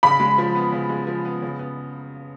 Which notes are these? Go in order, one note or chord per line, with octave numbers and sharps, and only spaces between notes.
C#3 B5
G#3
F3
B3
C#3
G#3
F3
B3
C#3
B3